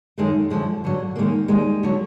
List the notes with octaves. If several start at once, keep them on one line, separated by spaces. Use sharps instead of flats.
F#2 D#3 G#3 A3
F#2 D3 F3 G#3
G2 D3 F#3
F#2 D#3 G#3 A#3
D#2 D#3 G3 G#3
D3 F#3